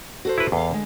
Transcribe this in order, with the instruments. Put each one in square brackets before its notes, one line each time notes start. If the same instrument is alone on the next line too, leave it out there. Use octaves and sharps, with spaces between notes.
[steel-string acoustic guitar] F#4 A4 C5
[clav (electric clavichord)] E4 B4
[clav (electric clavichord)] E2 [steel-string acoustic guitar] A4 F5
[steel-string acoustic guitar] D3 G#3